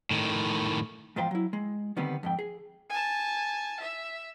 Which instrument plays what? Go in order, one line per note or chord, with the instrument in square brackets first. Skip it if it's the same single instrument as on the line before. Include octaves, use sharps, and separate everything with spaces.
[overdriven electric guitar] A2 D#3
[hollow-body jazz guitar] E2 G#2 F3 F4 C5 G5
F#3 E4
G#3
D3 D#3 G3 B3 C4
F2 G#2 G5
G#4
[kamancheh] G#5 A5
E5